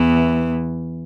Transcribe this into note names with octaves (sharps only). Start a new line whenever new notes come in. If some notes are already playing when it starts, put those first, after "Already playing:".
Already playing: E2 E3